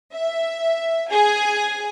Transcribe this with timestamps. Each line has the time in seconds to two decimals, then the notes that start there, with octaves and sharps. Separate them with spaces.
0.13 E5
1.11 G#4 G#5